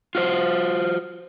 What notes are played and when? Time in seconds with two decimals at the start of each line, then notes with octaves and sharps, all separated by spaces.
0.15 F4 F#4 C5